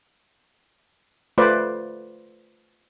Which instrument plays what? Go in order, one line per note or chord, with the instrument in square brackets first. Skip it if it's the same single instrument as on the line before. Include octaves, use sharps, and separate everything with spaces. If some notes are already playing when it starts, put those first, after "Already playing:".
[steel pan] A3 F4 B4 C5 D5